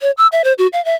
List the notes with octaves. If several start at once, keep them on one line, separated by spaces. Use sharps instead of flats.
C#5
E6
E5
C5
F#4
F5
E5